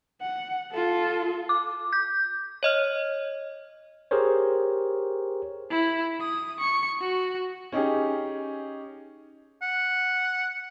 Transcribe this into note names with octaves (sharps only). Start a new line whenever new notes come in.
F#5
F4 A4
D6
G6
C#5 D#5 F6
G4 G#4 A#4 C5 C#5
E4
D#6
C#6
F#4
C#4 D#4 G4 G#4
F#5